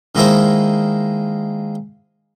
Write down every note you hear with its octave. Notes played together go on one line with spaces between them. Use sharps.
D#3 G#3 A#3 E4 A#4 C5